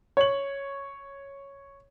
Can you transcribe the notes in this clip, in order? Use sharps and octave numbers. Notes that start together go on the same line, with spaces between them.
C#5 F#7